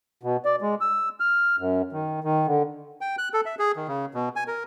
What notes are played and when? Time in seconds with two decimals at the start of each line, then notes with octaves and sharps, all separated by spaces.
0.23 B2
0.45 D5
0.62 G#3
0.81 E6
1.20 F6
1.59 F#2
1.92 D#3
2.24 D#3
2.47 D3
3.01 G5
3.18 F#6
3.34 A4
3.46 E5
3.59 G#4
3.76 D#3
3.88 C#3
4.14 B2
4.36 G#5
4.47 A#4